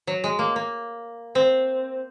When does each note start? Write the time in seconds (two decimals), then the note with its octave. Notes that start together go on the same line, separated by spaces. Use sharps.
0.07 F#3
0.24 G#3
0.39 A#3
0.56 A#3
1.35 C4